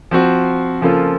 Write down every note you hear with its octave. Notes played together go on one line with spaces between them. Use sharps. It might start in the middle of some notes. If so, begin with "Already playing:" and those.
F3 C4 F#4
C#3 F3 A#3 F4 A4